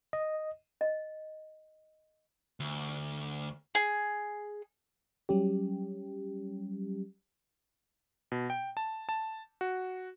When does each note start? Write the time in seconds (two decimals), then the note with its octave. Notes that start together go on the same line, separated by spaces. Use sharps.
0.13 D#5
0.81 D#5
2.60 D2
3.75 G#4
5.29 F#3 G3 C#4 G4
8.32 B2
8.50 G5
8.77 A5
9.09 A5
9.61 F#4